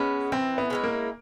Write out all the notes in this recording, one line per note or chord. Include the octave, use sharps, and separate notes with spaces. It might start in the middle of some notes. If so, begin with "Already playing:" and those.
Already playing: G#3 B3 C#4
E3 C4
B3
G#3 C#4 E4
A#3